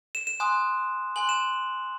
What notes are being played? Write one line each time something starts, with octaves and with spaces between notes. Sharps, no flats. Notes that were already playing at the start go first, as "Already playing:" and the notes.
E7
E7
G#5 C6 D#6 F#6
G#5 C6 F#6 F#7
E7